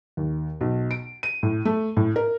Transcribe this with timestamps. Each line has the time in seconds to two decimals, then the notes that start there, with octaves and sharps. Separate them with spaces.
0.17 D#2
0.61 B1
0.91 D7
1.23 D#7
1.43 A2
1.65 A3
1.97 A2
2.16 A#4